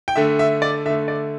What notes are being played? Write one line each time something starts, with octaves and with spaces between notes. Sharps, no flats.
G5
D3 A3 E5
E5
D5
D3 A3 E5
D5